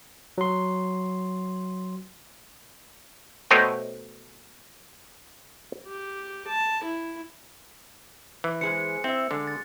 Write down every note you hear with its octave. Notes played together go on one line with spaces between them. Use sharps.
F#3 C6
B2 A3 C5 C#5 D#5 G5
G4
A5
E4
E3
G#3 G#4 C5 C#7
C4 E4 E5
D3 G#3
A6